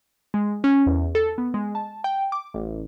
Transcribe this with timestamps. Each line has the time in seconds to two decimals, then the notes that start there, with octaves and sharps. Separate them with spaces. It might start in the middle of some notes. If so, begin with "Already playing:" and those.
0.34 G#3
0.64 C#4
0.86 E2
1.15 A4
1.38 B3
1.54 G#3
1.75 A5
2.04 G5
2.32 D6
2.54 A1